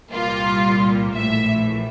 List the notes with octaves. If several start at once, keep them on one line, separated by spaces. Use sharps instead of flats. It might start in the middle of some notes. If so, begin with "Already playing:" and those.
C2 A#2 G3 A#3 F4
A#1 A2 E3 A3 E5